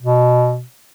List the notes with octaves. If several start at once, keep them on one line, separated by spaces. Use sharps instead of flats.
B2